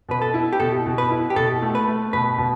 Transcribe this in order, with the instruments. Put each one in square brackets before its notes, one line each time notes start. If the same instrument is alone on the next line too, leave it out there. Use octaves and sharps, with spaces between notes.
[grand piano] B2 [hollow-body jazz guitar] B4
[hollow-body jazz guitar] A4
[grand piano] E4
[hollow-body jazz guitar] G4
[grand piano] B2 [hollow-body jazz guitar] A4
[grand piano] B2
[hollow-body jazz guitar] B4
[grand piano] E4
[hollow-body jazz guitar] G4
[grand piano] B2 [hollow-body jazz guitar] A4
[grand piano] A3
[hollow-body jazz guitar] B4
[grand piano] A3
[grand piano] B2 [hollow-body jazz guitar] B4
[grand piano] B2